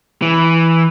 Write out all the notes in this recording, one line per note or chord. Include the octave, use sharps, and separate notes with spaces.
E3